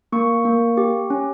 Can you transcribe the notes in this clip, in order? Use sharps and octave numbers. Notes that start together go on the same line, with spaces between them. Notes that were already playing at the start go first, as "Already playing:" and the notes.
A#3 C#6
A#3
G4
C#4